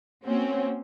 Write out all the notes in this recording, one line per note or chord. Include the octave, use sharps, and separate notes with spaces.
A#3 C4 C#4 F#4